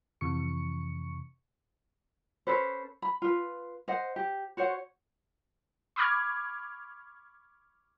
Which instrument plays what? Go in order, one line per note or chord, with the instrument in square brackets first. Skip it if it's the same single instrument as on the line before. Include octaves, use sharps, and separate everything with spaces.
[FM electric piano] F2 C3 E3 C#6 C#7
[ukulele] C#4 A4 B4 C5
B5
F4 B4
C5 D#5 F#5
G4
F#4 C5 C#5 F#5
[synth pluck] B5 C#6 D6 F6 G#6